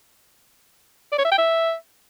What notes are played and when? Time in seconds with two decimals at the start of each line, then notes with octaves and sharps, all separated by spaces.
1.12 D5
1.18 C#5
1.25 E5
1.31 G5
1.38 E5